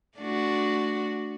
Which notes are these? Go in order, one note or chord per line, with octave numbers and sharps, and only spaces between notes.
A3 D4 F#4